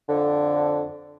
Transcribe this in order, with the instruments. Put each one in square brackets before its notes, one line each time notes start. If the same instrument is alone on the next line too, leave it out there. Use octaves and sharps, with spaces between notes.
[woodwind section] F2 D3